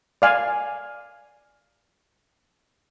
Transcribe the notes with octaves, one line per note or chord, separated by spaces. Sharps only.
D5 F5 G#5